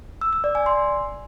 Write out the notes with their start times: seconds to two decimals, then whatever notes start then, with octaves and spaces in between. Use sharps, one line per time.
0.21 E6
0.33 E6
0.44 D5
0.55 G#5
0.66 C6